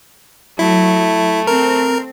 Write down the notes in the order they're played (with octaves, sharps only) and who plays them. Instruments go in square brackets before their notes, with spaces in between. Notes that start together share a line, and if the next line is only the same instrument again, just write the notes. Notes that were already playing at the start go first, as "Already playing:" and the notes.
[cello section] F#3 [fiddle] A3 [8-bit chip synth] E4
[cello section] C4 [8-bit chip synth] A#4